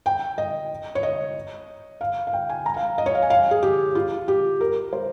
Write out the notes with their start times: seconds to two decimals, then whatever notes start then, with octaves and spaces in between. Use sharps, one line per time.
0.06 G5
0.38 D#5
0.95 C#5
1.03 D#5
2.01 F5
2.27 F5
2.33 G5
2.49 G#5
2.66 A#5
2.76 F5
2.98 D#5
3.06 C#5
3.15 F5
3.22 G#5
3.30 F5
3.51 G#4
3.63 G4
3.95 F4
4.28 G4
4.61 A#4
4.93 C5